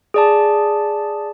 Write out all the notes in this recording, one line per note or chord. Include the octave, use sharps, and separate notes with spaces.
G#4 D5 A5